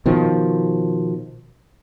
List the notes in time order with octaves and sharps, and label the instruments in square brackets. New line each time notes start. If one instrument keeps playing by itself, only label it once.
[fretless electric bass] B2 D#3 F3